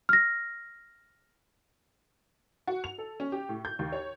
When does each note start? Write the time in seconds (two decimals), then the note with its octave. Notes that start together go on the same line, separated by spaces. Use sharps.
0.09 F6 A#6
2.67 F#4
2.84 F7
2.98 A4
3.20 C#4
3.32 G4
3.49 A2
3.65 G6
3.79 D#2
3.92 C#5